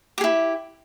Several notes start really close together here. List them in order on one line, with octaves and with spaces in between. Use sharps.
G4 G#4 E4